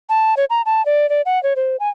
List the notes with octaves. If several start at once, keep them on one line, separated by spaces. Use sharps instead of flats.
A5
C#5
A#5
A5
D5
D5
F#5
C#5
C5
G#5